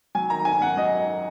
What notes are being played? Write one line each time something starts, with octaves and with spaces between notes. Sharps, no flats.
F#3 G#5
D#3 A#5
G#1 G#5
F#2 F#5
F#3 D#5
D#3